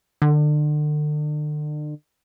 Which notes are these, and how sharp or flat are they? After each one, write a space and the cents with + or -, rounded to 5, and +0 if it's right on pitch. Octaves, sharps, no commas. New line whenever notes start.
D3 +35